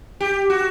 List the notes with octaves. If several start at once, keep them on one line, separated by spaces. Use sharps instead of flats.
G4
F#4